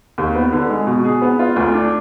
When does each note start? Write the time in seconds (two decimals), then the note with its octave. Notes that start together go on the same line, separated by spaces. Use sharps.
0.18 D#2
0.35 B3
0.53 D3
0.69 G#3
0.87 B2
1.04 G#4
1.21 B3
1.39 F4
1.56 D2
1.74 D4